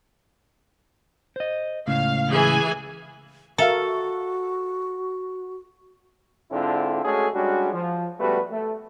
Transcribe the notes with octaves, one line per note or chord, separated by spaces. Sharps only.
C5 D#5
C#2 A2 C#3 F5
E3 G#4 G#5
F#4 A4 A#4 E5 F5
G#2 D3 C4 D4 E4 F4
G#3 A3 C#4 F#4 G#4 A4
G3 G#3 C#4 D4 F#4
F3
C#2 G3 A3 B3 F#4 B4
A3